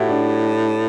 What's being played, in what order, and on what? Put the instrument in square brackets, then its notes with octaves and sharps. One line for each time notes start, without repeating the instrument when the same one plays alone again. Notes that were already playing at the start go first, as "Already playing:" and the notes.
Already playing: [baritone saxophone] A2 [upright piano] E4 F#4 G4
[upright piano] D4